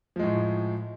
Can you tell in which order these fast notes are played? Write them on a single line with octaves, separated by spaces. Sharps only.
F3 G#3 A2